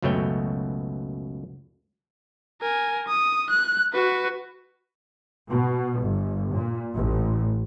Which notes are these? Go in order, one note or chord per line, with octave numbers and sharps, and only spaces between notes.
C#2 F#2 B2 A3 C#5 G5
A#4 G#5
D#6
F#6
F#4 B4
B2
G1
A#2
A1